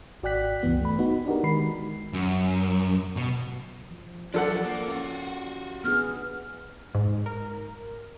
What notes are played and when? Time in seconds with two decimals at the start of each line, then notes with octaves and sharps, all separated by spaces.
0.23 G#1 F#4 D5 G5 F#6 B6
0.63 C#2 G2 E3 B3
0.81 A3 B5
0.99 B3 D#4 F#4
1.26 D4 D#4 F#4 G4 A#4
1.43 D#3 G#3 B5 C7
2.13 F#2
3.17 B2
3.91 F3
4.34 F3 F#3 D4 A4 D5 F#5
4.65 A#3
4.87 C#4 F4 F#4
5.84 B3 D4 G#4 F6
6.95 G#2
7.26 A#4